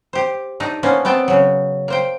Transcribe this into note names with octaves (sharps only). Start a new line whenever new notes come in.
G4 C5
A3 D4 D#4
A#3 B3 C#4 D4 C5
B3 C4 G5 A5
C#3 F#3
A#3 C5 G5